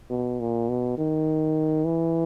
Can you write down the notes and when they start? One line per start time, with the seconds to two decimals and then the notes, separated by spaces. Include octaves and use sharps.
0.10 B2
0.40 A#2
0.69 B2
0.98 D#3
1.85 E3